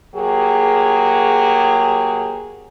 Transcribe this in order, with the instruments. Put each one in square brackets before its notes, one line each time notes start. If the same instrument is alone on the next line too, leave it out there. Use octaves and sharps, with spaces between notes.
[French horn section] F#3 A#3 G4 G#4